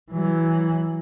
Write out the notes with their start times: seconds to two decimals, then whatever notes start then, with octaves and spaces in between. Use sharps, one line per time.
0.11 E3 F#3